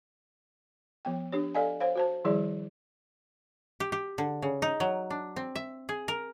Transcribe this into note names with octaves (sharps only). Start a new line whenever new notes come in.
F3 B3 G5
D4 G4 C#5
A4 D5 D#5 F5 G#5
C5 C#5 F5
F#4 C5 A5
D#3 F3 G3 E4 G#4 D5
G4
G4
D3
C#3
D#4
F#3
D4
C4
E5
G#4
A#4